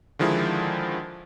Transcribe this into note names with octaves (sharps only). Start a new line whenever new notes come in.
D3 D#3 F3 G#3 E4